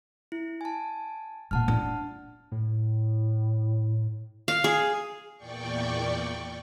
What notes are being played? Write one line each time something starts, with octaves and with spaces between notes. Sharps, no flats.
E4
G#5 A5
E1 A#2 F#5 A5 F6
D4 F4
A2
F5
G#4
E2 A#2 D5 G5 C#6